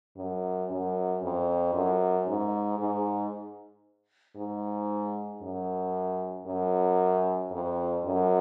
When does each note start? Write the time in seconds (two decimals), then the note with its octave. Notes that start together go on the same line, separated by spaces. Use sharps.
0.17 F#2
0.70 F#2
1.22 F2
1.74 F#2
2.27 G#2
2.79 G#2
4.37 G#2
5.42 F#2
6.47 F#2
7.51 F2
8.05 F#2